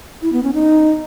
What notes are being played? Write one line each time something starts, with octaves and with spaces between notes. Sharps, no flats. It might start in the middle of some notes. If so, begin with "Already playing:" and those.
E4
B3
C#4
D#4